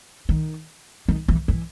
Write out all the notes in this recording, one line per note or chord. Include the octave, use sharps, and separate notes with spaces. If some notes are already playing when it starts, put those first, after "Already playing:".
D#3
D#3
E3
E3